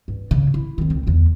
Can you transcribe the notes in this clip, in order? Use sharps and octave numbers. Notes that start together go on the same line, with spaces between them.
G2
C#3
E4
D#3 C4
C#2 C#3
E2 D3